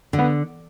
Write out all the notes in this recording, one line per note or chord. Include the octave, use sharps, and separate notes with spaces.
D3
B3